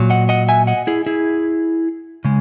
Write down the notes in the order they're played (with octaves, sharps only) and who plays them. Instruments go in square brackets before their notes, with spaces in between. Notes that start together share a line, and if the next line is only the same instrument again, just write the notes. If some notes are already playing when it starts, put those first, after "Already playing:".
Already playing: [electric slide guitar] A#2 F#3
D#5 F#5
D#5 F#5
E5 G#5
D#5 F#5
E4 G#4
E4 G#4
C#3 G#3